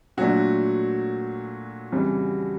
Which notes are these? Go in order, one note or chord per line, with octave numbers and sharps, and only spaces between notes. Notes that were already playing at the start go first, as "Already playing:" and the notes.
A#2 F#3 A3 D4 F#4
F2 C#3 E3 G3